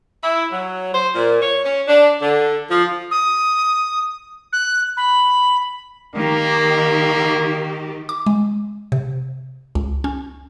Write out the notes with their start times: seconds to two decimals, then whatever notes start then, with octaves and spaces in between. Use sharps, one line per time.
0.23 E4
0.51 F#3
0.94 C5
1.14 A#2
1.42 C#5
1.65 C#4
1.87 D4
2.22 D3
2.70 F3
3.11 D#6
4.53 F#6
4.97 B5
6.15 D#3 A#3 G4
8.09 D6
8.26 G#3
8.92 C3
9.75 C#2
10.04 C#4